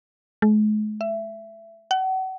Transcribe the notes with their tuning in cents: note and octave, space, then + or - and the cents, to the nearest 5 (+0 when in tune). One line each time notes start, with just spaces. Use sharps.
G#3 +45
E5 +20
F#5 +35